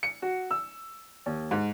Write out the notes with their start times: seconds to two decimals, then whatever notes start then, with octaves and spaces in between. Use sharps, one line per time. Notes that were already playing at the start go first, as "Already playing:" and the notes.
0.03 C#7
0.22 F#4
0.51 E6
1.26 D#2
1.51 G#2